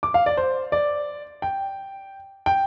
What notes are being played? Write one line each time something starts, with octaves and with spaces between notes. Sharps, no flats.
D6
F5
D5
C5
D5
G5
G5